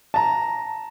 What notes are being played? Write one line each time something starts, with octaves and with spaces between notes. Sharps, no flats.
A5 A#5